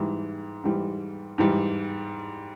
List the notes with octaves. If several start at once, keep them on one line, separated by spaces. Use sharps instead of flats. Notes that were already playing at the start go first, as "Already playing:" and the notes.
Already playing: G#2 E3 G3
G#2 E3 G3
G#2 E3 G3